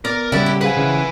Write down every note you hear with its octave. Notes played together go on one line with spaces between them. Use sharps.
B3 A#4 D5
C#3 G3 E4 G4 D5 F#5
G4
G#4 B4 C5 F5 F#5 G#5
C#3 E3